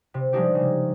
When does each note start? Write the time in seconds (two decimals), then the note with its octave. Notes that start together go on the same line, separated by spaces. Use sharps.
0.14 C3
0.33 F3 G3 G#3 D4 D#4 G4
0.55 C#3 G#3